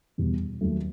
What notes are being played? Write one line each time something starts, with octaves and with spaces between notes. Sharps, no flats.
E2 B2 G3
D#2 D#3 F#3 A3